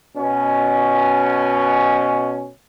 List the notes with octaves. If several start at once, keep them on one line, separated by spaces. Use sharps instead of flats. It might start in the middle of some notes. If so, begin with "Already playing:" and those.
B2 C#4